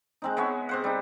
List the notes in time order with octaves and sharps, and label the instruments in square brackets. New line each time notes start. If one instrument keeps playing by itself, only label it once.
[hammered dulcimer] G#3 C4 D#4
G#3 B3 C#5 E5
C3 C5 F#5
G3 D#4